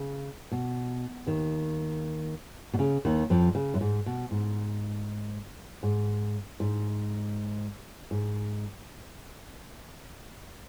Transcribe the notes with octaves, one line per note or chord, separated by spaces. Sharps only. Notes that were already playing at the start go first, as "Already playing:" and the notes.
Already playing: C#3
B2
D#2 D#3
B2
C#3
D#2 D#3
F2 F3
C#3
F#2
G#2
B2
G#2
G#2
G#2
G#2